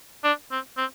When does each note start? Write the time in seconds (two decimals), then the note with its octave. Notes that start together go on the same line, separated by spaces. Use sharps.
0.24 D4
0.51 C4
0.77 C4